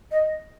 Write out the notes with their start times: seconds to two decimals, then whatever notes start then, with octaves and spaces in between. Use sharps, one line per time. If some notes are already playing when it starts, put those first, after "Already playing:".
0.11 D#5